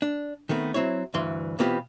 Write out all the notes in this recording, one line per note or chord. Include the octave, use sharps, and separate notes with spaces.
D4
D#3 A3 B3 C4
F#3 C4 E4 C#5
D2 G2 E3 C6
B2 E3 B3 C4 F4 G4